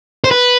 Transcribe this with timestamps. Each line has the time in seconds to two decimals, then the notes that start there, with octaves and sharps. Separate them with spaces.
0.24 C5
0.31 B4